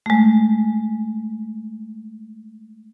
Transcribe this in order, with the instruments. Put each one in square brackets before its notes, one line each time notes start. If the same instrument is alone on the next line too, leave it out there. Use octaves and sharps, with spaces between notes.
[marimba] G#3 A3